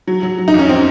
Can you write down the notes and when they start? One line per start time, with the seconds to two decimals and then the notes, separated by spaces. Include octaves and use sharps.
0.07 F#3
0.23 F#3
0.38 F#3
0.48 D#4
0.54 F2 C#4
0.69 C4